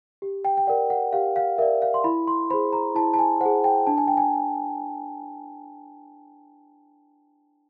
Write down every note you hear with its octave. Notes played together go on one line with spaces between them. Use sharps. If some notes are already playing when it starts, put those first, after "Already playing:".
G4
G5
G5
A#4 D5 F#5
F#5
G4 F5
F5
A#4 D5 E5
F5
C6
E4 B5
C6
G#4 C5 B5
A#5
E4 A5
A5
G#5
G#4 C5 F#5
G5
D4 A5
G#5
G5
G#5